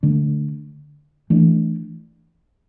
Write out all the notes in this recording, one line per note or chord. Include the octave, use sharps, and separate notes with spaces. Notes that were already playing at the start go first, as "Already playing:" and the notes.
D3 A3 D4
E3 A3 D4